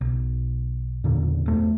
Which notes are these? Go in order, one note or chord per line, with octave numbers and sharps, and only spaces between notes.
B1
F#1 E2 A#2 D3
E2 A3